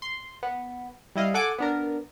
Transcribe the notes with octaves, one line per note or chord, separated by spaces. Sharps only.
C6
B3
G3 E4 D#5 F5
A4 F#5 G#5 D6
B3 D4 A#4